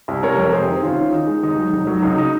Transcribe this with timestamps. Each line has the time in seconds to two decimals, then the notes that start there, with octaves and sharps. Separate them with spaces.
0.08 C2
0.23 C3 A#4 C#5
0.38 F2
0.52 C3 G#4 C5
0.68 D#3
0.83 D#2 C#4 F4
0.98 D#3
1.12 D#3 D#4
1.27 G#3
1.43 D#2 D#4
1.58 F#3
1.73 F1
1.87 F#3
2.02 C#2 D#4
2.18 D#4